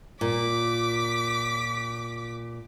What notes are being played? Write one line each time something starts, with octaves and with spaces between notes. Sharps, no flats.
A#2 D6 B6